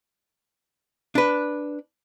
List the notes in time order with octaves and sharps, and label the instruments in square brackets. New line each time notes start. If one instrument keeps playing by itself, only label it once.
[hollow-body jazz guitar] D4 B4